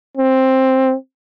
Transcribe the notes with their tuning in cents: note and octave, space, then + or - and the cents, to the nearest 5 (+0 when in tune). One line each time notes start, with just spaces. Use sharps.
C4 +10